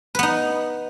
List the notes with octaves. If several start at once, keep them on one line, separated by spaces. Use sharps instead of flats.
B3 D#4 B4